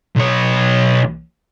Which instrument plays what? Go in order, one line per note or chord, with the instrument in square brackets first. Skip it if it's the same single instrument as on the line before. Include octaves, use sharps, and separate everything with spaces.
[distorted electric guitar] B1 C#5